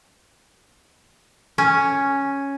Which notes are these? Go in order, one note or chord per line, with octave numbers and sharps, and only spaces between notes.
C#4